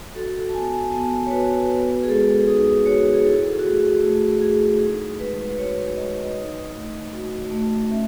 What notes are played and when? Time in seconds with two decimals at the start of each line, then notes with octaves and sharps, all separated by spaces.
0.15 F#4 A4
0.49 A5
0.53 B3 G#5
0.92 B3 A5
1.26 C#5
1.31 F#4 B4
1.70 B3 B4
2.04 G#4
2.08 G#3 A4
2.47 D#4 G#4
2.86 F#4 C#5
3.14 G#4
3.25 E4 A4
3.59 F#4
3.64 A3 G#4
4.03 A3
4.41 E4 G#4
4.81 D#4
5.19 G#3 B4
5.57 F#4 C#5
5.96 G#3 D#5
6.36 D#4
6.74 A3
7.13 F#4
7.51 A3
7.90 C#4 E5